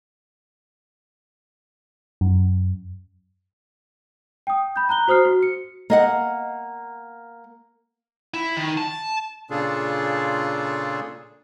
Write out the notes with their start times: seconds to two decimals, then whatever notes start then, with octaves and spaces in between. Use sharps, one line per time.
2.21 F#2
4.47 G5 D#6
4.76 B5 G6
4.89 A#5 F#6 G7
5.08 F#4 C5 D#6 F6 C7
5.26 F#4
5.43 C#7
5.90 A#3 D#5 F#5
8.34 E4
8.57 D#3
8.77 A5
9.50 A#2 C#3 D4 F4 G#4 A4